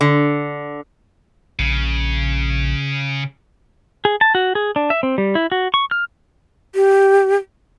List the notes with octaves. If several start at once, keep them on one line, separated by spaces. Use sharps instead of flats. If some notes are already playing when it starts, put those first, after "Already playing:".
D3
A#1 C#3
G#4
A5
F#4
G#4
D4
E5
C4
G3
E4
F#4
C#6
F6
G4